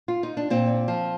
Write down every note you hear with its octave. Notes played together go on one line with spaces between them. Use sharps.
F4
D#4
D4
A#2 C4
F3